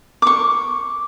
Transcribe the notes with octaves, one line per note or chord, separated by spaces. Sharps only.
C#6 D6